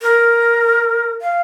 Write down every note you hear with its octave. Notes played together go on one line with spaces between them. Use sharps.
A#4
F5